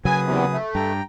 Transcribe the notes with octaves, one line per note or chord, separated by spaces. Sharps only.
C#3 F#3 G#4 B4 G#5 D#6
E2 C3
A3
G2 G5 A#5